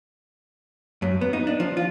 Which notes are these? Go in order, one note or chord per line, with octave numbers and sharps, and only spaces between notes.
F#2
B3
D#4
D4
F3
F4